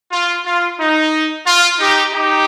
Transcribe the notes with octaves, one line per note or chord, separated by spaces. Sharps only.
F4
F4
D#4
F4
D#4 G4
D#4 G4